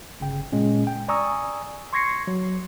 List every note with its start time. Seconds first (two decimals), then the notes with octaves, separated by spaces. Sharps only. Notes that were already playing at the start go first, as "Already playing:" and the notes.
0.20 G1 C#3 G5
0.52 A#2 G#3 C#4
0.87 G5
1.08 D5 G#5 A#5 C#6 D#6 E6
1.93 C6 C#6 G#6 A#6 C7 C#7
2.27 F#3